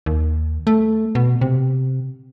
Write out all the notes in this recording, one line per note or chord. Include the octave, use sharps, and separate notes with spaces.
D#2
A3
B2
C3